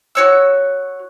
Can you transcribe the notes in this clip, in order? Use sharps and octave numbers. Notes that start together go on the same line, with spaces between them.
F#4 C#5 E6